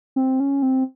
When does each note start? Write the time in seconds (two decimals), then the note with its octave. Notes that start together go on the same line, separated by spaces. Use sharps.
0.16 C4
0.40 C#4
0.62 C4